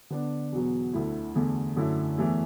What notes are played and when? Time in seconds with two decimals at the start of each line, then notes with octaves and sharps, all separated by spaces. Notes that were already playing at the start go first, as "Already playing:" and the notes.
0.10 D3 B3 D4
0.52 E2 B2 F#3 B3
0.93 D2 D3 A3 E4
1.35 E2 D3 A3
1.76 F#2 D3 A3 E4
2.17 E2 E3 A3 E4